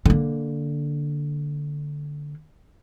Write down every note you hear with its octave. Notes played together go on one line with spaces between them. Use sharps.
D3 A#3